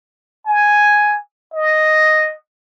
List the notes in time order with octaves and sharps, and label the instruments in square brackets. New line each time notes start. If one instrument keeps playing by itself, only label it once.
[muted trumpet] G#5
D#5